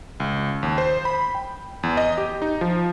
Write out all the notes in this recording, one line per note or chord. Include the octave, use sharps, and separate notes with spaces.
C#2
D#2
C5
B5
G5
E2
D#5
G4
D#4
F3